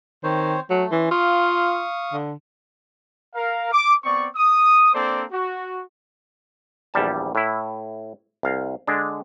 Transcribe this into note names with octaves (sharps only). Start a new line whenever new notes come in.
D#3 C4 C5 C#5
F#3 A3
E3 C#4 C6
F4 F5 C#6 D#6
D3
A#4 F5
D6
B3 C4 D5 C#6
D#6
A#3 C4 D4 A4 C5 D5
F#4
A#1 E2 G3 A5
A2 E4
C2 F5
D3 G#3 D4